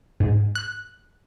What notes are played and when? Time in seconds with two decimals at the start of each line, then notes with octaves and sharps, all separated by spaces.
0.20 G#2
0.55 F#6